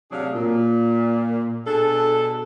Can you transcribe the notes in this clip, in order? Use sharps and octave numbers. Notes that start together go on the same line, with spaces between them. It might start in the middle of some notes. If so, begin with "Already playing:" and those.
A2 C3 F#3 D4 G#4 F5
A#2
B2 D4 G#4 A4